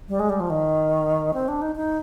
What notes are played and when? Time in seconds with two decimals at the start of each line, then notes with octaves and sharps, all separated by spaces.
0.09 G3
0.19 G#3
0.30 G3
0.40 F3
0.50 D#3
1.34 C4
1.48 D4
1.62 D#4
1.76 D#4